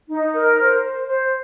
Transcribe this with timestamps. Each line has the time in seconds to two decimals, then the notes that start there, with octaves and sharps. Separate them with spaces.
0.09 D#4
0.33 A#4
0.58 C5
0.83 C5
1.06 C5